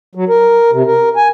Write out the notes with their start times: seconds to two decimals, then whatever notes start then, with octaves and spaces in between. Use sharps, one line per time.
0.15 F#3
0.29 A#4
0.72 C3
0.86 A#4
1.16 G#5